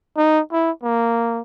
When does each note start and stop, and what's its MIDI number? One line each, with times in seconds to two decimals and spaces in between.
0.17 0.41 63
0.52 0.71 64
0.83 1.42 58